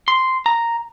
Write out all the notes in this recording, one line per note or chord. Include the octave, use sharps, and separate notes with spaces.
C6
A#5